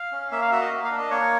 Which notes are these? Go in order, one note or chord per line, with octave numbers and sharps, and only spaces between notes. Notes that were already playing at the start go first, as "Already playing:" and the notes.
Already playing: F5
C#4
A#3 E5
F5
F#4 E5
D#5
A#3
F5
D4
D#5
A#3 C#5